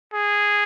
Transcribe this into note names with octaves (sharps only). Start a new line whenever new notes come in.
G#4